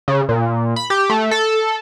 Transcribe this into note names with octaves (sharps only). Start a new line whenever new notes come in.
C#3
A#2
B5
G4
A3
A4